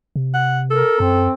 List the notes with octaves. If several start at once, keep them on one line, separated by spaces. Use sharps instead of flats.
C3
F#5
A4 A#4
F#2 C4